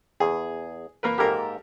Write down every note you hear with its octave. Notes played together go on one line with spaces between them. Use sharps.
E2 G#4
A#3 A#4 B4
G#2 A#3 G4 A4 A#4